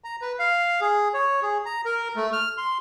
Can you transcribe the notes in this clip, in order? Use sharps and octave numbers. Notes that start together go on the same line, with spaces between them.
A#5
B4
F5
G#4
C#5
G#4
A#5
A#4
A3
F6
C6